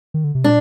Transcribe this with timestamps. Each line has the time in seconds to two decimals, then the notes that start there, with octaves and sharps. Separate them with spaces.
0.14 D#3
0.24 D3
0.35 C3
0.44 A#2 D4